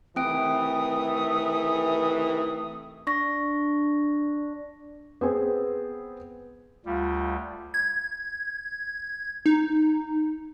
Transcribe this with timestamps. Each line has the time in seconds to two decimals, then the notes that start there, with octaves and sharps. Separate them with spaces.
0.16 C3 D#3 E3 A3 C4 G5 D#6 D7
3.07 D4 C#6 A#6
5.21 B3 C4 G#4
6.86 D2 G3 F4
7.74 G#6
9.46 D#4